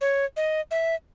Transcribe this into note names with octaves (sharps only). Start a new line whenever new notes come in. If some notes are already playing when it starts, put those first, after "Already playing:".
C#5
D#5
E5